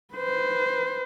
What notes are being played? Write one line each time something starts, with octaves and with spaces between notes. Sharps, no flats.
B4 C5